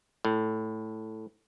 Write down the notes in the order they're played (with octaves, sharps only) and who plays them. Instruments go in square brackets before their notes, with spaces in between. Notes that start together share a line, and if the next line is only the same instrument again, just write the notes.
[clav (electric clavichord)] A2